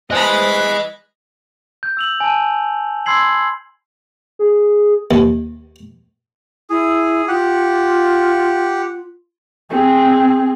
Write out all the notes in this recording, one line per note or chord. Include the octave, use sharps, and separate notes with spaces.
E3 C5 D#5 G#5 B5 F#6
G6
E6 F7 F#7
G#5 A5
B5 C6 E6 G#6 C7 F#7
G#4
D#2
E4 G#4
F4 G4 F#5
C4 G#4